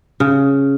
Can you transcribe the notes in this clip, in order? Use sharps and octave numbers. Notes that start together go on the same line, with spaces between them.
C#3